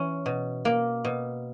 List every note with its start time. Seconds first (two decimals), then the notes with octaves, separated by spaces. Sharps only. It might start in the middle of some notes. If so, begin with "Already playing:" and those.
Already playing: E3 C#4
0.26 B2
0.65 A#3
1.04 B2